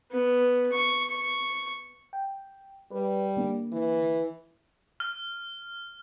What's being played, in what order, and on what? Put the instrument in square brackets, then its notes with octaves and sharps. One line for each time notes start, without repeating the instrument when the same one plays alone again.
[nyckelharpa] B3
C#6
C#6
[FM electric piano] G5
[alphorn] G3 [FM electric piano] B4
[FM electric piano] D3 A#3
[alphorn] E3
[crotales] F6